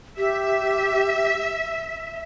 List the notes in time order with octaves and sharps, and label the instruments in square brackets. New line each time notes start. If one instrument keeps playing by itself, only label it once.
[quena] G4 [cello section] E5